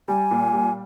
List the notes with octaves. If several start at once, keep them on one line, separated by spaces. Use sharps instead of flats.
G3 G#5
A#2
G3